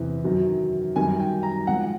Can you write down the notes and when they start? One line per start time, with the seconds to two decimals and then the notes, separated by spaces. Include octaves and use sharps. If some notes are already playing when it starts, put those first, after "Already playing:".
Already playing: E2 C3 E3
0.24 F#2 D#3 F#3
0.96 F#2 D#3 G3 G#5
1.20 G5
1.43 A#5
1.67 G#2 F3 F#5